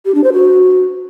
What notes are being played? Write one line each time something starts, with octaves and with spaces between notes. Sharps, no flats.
G4
D4
C5
F#4